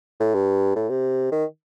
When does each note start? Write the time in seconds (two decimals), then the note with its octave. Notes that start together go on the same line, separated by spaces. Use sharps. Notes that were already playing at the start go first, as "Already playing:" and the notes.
0.20 A2
0.34 G2
0.76 A2
0.89 C3
1.32 D#3